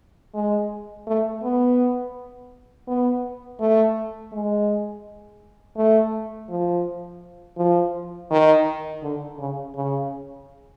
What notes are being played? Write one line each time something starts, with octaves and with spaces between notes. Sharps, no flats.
G#3
A3
B3
B3
A3
G#3
A3
F3
F3
D#3
D3
C#3
C#3